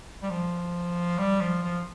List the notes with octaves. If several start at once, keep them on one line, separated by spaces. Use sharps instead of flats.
G3
F3
G3
F3
F3